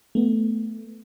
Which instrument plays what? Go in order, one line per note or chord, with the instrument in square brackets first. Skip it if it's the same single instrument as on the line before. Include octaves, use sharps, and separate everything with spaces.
[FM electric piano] A3 B3